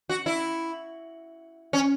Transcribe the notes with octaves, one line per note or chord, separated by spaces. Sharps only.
F#4
E4
C#4